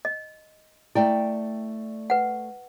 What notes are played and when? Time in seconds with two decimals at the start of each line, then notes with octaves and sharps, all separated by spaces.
0.05 D#5
0.95 A3 E4 D5 G5
2.10 B4 F#5